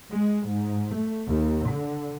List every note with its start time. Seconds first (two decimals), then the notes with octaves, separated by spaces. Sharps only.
0.11 G#3
0.47 G#2
0.94 A3
1.27 D#2
1.71 D3